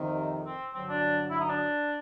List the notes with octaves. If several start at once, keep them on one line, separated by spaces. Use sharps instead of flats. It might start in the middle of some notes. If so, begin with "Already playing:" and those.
Already playing: F2 C3 D#3
C4
G2 D3 F#3 C4
D4
E4
D#4
D4